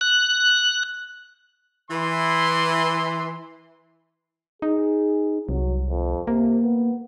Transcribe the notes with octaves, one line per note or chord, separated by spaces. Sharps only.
F#6
E3 C6
D#4 G#4
C2 F#3
F2
C3 A#3
B3